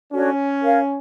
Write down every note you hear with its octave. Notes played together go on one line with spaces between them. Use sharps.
C#4 D4 F#4 A4 C#5
A#4 C#5 F5